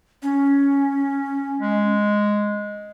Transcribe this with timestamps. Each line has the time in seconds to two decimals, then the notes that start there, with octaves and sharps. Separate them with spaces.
0.22 C#4
1.60 G#3